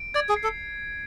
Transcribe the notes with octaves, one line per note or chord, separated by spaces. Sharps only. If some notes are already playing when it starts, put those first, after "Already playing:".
Already playing: D7
D5 G#6
G#4
C7
A4